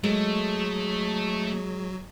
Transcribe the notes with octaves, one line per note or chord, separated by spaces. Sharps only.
F#3 G#3 A3